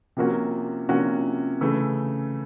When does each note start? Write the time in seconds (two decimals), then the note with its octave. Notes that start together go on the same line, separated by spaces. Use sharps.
0.17 C3 F3 A#3 C#4 F#4
0.88 C3 F3 A#3 C#4 F#4
1.61 C#3 E3 A3